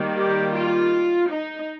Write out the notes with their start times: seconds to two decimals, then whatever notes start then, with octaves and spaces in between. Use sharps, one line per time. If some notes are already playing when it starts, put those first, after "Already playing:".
Already playing: D#3 G3 A#3
0.15 G4
0.53 F4
1.28 D#4